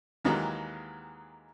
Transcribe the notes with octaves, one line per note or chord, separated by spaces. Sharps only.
D#2 D#3 E3 F#3 G#3